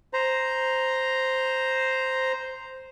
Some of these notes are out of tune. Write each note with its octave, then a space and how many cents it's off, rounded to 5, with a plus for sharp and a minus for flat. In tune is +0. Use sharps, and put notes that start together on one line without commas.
C5 +0 A#5 +0